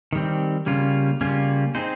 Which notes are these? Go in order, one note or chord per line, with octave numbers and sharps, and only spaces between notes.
D#3 G3 C4
C#3 G3 A#3 C#4 F4
C#3 G3 A#3 C#4 F4
C4 D#4 G#4 C5